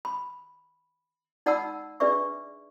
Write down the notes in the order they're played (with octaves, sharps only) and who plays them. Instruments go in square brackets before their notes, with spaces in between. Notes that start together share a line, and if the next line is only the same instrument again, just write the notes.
[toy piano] B5
D#4 D5 F#5 A5 B5 E6
D4 G#4 B4 D5 E5 C#6